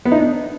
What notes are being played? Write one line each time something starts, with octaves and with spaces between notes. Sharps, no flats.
B3
D#4
D4